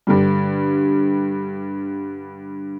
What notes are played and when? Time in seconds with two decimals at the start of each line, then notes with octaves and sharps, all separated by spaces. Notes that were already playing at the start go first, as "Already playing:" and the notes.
0.07 G2 D3 G3